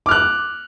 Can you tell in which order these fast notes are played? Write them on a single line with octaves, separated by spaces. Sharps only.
D6 F6 F#6